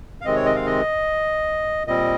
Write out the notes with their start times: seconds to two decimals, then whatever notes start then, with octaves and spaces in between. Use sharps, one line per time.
0.21 F5
0.25 C3 D#3 G#3 C4 D#5
0.36 C#5
0.45 D#5
0.56 F5
0.66 D#5
1.87 A#2 G3 C4 D#5